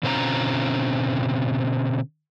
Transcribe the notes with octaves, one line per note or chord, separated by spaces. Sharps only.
B2 D3 C4 C#4 F4 A#5